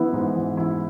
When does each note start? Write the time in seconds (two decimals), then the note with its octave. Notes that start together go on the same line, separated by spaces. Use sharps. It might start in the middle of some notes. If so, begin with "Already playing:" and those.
Already playing: E3 B3 E4
0.13 G#2
0.35 E3
0.57 E4